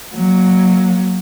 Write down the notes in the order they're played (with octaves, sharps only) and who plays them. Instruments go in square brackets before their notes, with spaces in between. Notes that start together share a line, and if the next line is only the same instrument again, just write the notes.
[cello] F#3 A#3